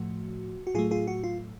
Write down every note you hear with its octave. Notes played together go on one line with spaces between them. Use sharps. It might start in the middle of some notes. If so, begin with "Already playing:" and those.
Already playing: A2 F3 A3 F#4
F#4
A2 F#3 A3 F4 G#4
F4 G#4
F#4
F4